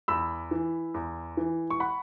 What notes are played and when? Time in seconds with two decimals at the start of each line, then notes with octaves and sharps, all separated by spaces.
0.08 E2 B5 E6
0.51 E3
0.94 E2
1.37 E3
1.70 C#6
1.80 F#5 B5